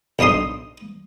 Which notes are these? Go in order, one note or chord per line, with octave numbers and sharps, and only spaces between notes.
B1 D4 D#4 C6 D#6